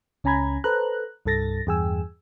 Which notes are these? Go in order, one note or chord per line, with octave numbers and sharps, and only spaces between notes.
C#2 C#4 G#5 A#5 B5 G#6
A4 B4 C5 A#5 F#6
C2 G2 A4 A6 A#6
E2 G2 G#4 G5 G#5 E6